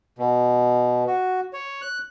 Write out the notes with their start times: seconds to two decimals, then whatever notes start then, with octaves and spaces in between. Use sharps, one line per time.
0.19 B2
1.07 F#4
1.53 C#5
1.82 F#6